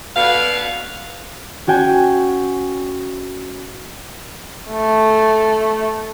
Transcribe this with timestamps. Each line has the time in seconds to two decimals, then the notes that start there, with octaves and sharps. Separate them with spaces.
0.16 B2 D3 B4 F5
1.67 C#4 F#4 G5 G#5
4.71 A3